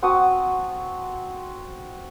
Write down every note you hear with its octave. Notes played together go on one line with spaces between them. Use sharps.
C4 F#4 A5 D#6